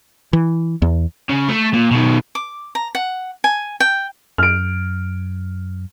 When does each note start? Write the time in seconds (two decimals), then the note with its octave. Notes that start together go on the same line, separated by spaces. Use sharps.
0.33 E3
0.82 E2
1.30 C#3
1.49 A3
1.73 A#2
1.91 B2 D#3
2.35 D6
2.75 A#5
2.95 F#5
3.44 G#5
3.80 G5
4.38 F#2 F6 D7